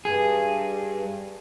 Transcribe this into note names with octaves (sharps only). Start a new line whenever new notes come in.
G2 G#4